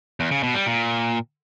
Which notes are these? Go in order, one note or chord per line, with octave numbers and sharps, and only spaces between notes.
E2
C#3
B2
G3
A#2